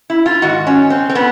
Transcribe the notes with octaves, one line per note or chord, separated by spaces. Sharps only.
E4
F4
G#2 D#3 F#4
C#4
C4
C4
B3